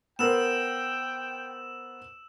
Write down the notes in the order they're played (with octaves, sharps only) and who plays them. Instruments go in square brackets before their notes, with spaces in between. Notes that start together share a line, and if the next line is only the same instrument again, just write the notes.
[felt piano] B3 A#4 C5 [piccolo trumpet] G5 [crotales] E6 E7